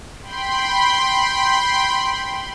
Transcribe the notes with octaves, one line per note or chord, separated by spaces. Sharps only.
G5 B5 C6